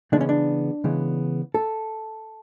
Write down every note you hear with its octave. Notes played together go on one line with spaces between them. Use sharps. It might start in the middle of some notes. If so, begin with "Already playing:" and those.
C#3 E3 G#3 B3 D4
C#4
D4
C#3 E3 G#3 B3
A4